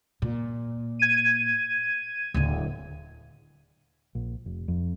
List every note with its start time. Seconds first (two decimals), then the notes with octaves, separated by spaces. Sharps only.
0.22 A#2
0.99 G#6 D#7
2.34 D1 D3
4.15 A#1
4.46 F1
4.68 F2